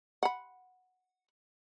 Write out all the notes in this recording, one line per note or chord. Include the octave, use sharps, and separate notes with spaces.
F#5 B5